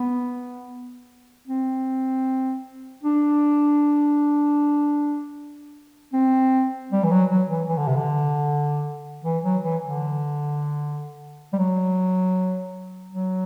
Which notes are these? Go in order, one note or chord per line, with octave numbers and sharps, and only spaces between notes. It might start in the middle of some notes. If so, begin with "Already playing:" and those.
Already playing: B3
C4
D4
C4
G3
E3
F#3
F#3
E3
E3
D3
C3
D3
E3
F#3
E3
D3
G3
F#3
F#3